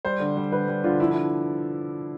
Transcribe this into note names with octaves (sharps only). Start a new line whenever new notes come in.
G3 C5
D3
G3
D3 B4
G3
D3 F4
F3 E4
E4